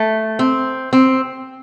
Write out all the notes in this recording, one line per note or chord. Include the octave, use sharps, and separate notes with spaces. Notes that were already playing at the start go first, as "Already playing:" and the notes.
Already playing: A3
C4
C4